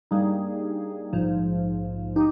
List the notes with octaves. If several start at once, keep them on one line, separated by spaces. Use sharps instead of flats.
G2 G3 A#3 D#4 G#4
A#1 G#2 F3
D#4 G4